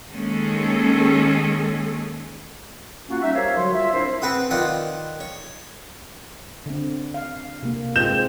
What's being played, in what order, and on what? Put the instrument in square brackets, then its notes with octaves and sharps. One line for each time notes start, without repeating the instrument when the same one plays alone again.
[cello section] D#3 G#3 A#3 C#4 G#4 A4
[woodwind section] A#3 C#4 F4 F#4
G3 C#4 D#4 E5
G4 A#4 C5 C#5 E5 F5
D3 F#3 G3 F#4 C#5 C6
F4 E5
C4 D4 E4 A#4 C5
[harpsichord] C4 B4 F#5 D#6
D#3 F4 D5 F#5 D#6
C#5
[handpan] D3 C4
F5
C3 A#3
[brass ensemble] G#2 G#3 C4 [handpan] F4 [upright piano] G6 E7